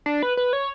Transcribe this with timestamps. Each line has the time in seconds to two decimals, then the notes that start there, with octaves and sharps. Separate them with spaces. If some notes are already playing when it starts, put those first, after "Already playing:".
0.06 D4
0.23 B4
0.37 B4
0.53 C#5